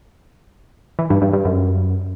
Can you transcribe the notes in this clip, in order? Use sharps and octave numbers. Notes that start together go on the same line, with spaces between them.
E3
G2
G2
G2
F#2